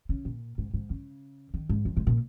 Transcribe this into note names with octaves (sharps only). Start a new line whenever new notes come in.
C#3
A#2
G#2
G#2
C#3
D#3
G#2
F2
G#2
A#2